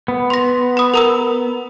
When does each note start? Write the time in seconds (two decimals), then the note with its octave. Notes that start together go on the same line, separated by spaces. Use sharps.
0.08 B3
0.30 C6 A#6
0.77 B5 D#6
0.94 A#4 A#5 E6